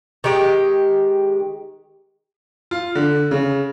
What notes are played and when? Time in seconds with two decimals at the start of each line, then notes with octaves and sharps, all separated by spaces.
0.24 D#3 G#3 G4
2.71 F4
2.95 D3
3.31 C#3